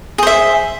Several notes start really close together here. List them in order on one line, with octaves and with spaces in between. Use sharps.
G#4 C5 E5